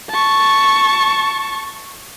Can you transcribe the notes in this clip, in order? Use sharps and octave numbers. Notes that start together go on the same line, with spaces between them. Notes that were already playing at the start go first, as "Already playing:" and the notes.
A5 C#6